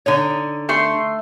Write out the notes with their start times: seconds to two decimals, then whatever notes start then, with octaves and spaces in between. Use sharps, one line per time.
0.06 D3 D#4 C#5
0.69 A3 C6